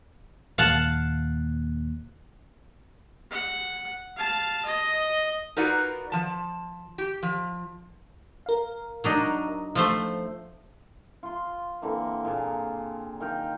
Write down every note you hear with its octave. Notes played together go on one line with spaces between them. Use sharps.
D#2 A#2 F5 F#5 A5
F#5
F5 A5
D#5
D#4 F4 F#4 A#4 B4 D5
F3 A5
G4
F3
A#4 F5
F#3 D4 D#4
D#5
F3 A3 C5
F4 C6
D3 E3 A#3 C4
A#2 G#4 F5 A5
D#3 D#5 F5 G5